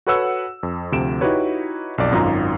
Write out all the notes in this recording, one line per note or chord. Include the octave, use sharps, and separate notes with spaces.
F#4 A4 B4 C#5 F#5 E6
F2
D2 C3 F3 D7 E7
D#4 E4 F#4 G4 B4 C#5
B1 F2 D5
G#1 F#2 D#4 F4 A#5 A#6